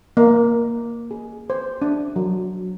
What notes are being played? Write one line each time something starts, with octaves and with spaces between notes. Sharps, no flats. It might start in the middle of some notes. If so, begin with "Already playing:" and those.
A#3
G#4
C5
D4
F#3